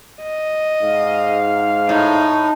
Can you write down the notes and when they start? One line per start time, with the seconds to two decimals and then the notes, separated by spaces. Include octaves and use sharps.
0.22 D#5
0.82 G#2 F5
1.89 A2 D#4